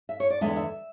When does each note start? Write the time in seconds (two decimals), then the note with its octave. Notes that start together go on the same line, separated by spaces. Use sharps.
0.09 E5
0.20 C#5
0.30 D5
0.41 E2 D3 G#3 B3 E5
0.56 E5